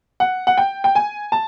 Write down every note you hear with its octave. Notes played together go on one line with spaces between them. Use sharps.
F#5
F#5
G5
G5
G#5
A5